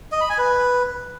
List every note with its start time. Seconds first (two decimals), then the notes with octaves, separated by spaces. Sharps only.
0.12 D#5
0.21 B5
0.29 G#5
0.38 B4